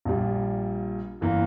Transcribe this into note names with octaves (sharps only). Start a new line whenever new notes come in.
A#1 A#2 G3
G1 E3 A#3